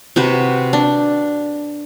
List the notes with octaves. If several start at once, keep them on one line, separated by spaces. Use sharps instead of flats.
C3 F#4 B4
D4